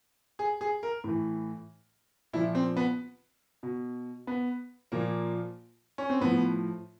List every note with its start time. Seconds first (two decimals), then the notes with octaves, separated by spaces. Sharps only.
0.39 G#4
0.61 G#4
0.83 A#4
1.04 A2 E3
2.33 A#2 F3 E4
2.55 C4
2.77 B3
3.63 B2
4.27 B3
4.92 A#2 F3 A#3
5.98 C#4
6.10 C4
6.21 A2 F3 B3